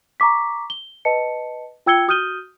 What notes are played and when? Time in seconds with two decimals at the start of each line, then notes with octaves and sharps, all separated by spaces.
0.20 A#5 C#6 D6 B6
0.70 G7
1.05 B4 D#5 A5 C#7
1.86 F4 G5 E6 G#6 C#7 G7
2.08 F#4 D#6 F6 G6 D#7 G7